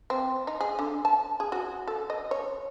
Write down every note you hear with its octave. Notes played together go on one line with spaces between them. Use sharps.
C4
D#4
G#4
D3
A5
G#4
F#4
A4
D#5
C#5